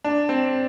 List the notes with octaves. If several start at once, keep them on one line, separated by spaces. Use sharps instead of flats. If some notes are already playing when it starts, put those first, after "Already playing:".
D4
C4